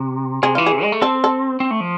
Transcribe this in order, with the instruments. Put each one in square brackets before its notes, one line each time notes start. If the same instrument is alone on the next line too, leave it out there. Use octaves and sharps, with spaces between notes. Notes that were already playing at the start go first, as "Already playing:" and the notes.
Already playing: [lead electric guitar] C3
[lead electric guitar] C3 [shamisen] G#4
[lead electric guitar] E3 [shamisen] F4
[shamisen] G#4
[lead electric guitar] C3
G#3
A3
[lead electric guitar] C4 [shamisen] A4
[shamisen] A4
[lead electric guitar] C4
A3
F3